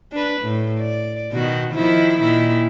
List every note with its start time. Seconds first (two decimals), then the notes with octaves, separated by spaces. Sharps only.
0.12 D4 B4
0.42 A2
0.79 D5
1.32 B2 D#3 F#4
1.74 D#3 F3 E4
2.21 A#2 D#3 E4